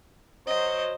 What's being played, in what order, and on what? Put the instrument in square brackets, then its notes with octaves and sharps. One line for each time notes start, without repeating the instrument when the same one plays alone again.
[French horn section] F#3 C5 [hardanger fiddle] D#5